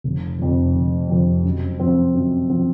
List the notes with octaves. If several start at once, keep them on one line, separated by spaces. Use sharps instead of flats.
F1
F2 C3 F3
F1
F2 C3 F3
F#2
F3 C4
F#2
F3 C4